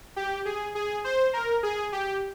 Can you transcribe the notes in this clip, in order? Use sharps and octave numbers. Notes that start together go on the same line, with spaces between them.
G4
G#4
G#4
C5
A#4
G#4
G4